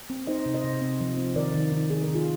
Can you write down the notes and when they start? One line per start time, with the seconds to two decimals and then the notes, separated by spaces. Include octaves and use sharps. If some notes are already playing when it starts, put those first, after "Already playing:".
0.10 C4
0.27 D#4 C5 D#5
0.46 C3
0.54 C5 D#5
0.64 C3
0.81 C4
1.01 F3
1.17 C4
1.36 D#3 A#4 D5
1.54 D#3
1.72 D#3
1.90 D#3 G#4
2.03 D#3 A#4
2.15 F4 G#4